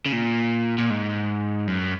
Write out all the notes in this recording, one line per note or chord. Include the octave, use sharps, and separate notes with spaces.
C#3
A#2
A#2
G#2
F#2